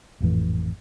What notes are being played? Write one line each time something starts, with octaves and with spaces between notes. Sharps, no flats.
G#1 F2 A2 E3